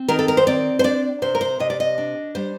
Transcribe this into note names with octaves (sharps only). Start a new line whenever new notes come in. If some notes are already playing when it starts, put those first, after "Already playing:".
Already playing: C4
D#3 A#4
A4
A#4
C5
C4 D5
C5
D4 D5
C3 C5
A#4
C5
C3 D#5
D5
D#5
D4
G3 C5